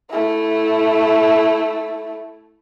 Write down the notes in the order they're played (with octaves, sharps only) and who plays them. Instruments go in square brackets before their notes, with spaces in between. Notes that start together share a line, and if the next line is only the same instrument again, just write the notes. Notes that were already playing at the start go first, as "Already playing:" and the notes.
[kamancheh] A3 E4